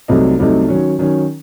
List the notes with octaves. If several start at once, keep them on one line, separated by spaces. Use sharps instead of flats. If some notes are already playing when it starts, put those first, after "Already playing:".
C2 C3 F#3 A3 D#4
C2 C3 F#3 A3 D#4
D#3 F#3 C#4
D#3 F#3 C#4